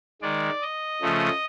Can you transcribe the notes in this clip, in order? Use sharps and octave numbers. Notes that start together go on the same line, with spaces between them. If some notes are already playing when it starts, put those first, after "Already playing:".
D#3 G#3 D5
D#5
C#3 F3 A3